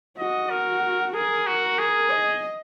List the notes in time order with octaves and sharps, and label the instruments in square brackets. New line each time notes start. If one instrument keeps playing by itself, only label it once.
[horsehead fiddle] F#4 [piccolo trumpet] D#5
[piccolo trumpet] A#4
[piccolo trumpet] G#4 [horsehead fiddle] A#4
[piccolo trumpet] F#4
G#4
[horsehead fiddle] D#5